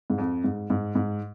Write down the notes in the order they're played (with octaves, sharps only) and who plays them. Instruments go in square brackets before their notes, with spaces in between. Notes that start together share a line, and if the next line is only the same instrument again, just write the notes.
[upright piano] G#2
F2
G#2
G#2
G#2